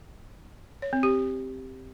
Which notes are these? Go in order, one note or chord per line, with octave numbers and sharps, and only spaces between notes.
C#5
C4
G4